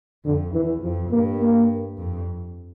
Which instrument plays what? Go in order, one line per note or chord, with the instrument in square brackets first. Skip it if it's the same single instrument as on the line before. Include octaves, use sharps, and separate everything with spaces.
[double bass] F2 [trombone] D3
[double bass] E2 [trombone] E3
[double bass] F2 [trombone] F3
[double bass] G2 [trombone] A#3
[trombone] A#3
[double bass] F2